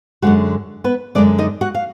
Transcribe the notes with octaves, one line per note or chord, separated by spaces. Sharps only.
F#2 D3 G#3 F#4 F#5
B3 B4
F#2 D3 G#3 D4 D5
D#4 D#5
F#4 F#5
F5